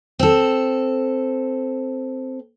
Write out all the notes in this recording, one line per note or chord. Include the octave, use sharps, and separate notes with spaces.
C4 A4